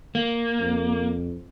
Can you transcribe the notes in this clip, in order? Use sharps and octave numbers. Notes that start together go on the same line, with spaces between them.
A#3
F2